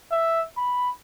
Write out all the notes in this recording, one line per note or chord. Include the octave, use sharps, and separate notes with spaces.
E5
B5